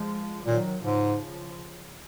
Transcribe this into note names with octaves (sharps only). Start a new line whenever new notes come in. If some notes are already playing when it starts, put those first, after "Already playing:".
Already playing: F3 G#3
A#2 D#3 F#3
G#2 C#3 F3